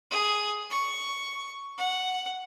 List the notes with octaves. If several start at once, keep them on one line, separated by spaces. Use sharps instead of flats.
G#4
C#6
F#5